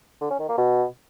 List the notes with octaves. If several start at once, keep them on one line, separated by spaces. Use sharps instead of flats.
D3
C#4
D#3
A#3
B2